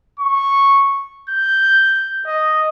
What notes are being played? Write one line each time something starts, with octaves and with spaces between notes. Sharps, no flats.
C#6
G6
D#5